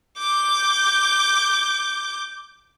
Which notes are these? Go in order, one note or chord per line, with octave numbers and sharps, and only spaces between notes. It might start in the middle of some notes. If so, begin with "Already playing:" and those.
D6 G6